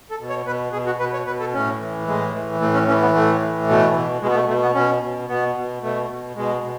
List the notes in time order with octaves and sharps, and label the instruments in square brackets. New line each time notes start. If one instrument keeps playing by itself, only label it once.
[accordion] A4
B2
C#5
B2 B4
B2 G#4
F#4
B2 B4
C#5
B2 B4
A4
A2 C#4
E3
A2 G#3
E3
A2 A3
C#4
E3 C#4
B3
A2 A3
E3
B2 A3
B2
B2 G#3
B3
A3
B2 A3
B3
B2 C#4
B2
B2 B3
B2
B2 A3
B2
B2 G#3
B2